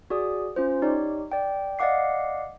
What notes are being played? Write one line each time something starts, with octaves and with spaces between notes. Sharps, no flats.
F#4 G#4 D5 D#6
C#4 F4 C5
D#4 G4 C#5 D5
D5 G5
D5 D#5 F5 F#5 D6 C7